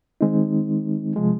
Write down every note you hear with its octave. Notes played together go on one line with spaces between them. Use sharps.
D#3 G#3 C4 D#4
C3 F3 G#3